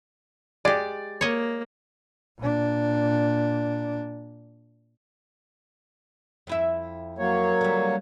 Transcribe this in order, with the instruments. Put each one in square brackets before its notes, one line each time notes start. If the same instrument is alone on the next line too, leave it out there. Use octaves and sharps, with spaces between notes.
[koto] G#3 G4 [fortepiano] D5
[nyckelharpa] A#3 [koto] C#5 D#5
[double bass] A#2 D4
[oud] F2 E4 E5
[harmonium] F#3 A#3 C#5
[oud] D3 G3